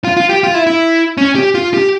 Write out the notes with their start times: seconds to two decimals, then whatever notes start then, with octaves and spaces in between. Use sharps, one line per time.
0.04 F4
0.17 F4
0.29 G4
0.43 F4
0.54 E4
0.67 E4
1.17 C#4
1.35 G4
1.55 F4
1.74 G4